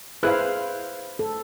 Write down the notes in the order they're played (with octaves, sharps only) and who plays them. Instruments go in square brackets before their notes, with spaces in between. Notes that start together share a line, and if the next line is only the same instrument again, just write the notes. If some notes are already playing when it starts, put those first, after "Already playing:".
[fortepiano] E4 G#4 F#6 [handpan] B4 C5 F5
[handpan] A4